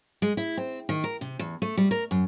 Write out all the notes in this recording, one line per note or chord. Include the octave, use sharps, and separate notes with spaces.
G#3
E4
C4
D#3
A#4
C3
E2
A3
G3
A#4
F#2